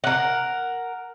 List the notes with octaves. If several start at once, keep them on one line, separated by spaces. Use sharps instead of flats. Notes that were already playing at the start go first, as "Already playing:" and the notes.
A#4 F#5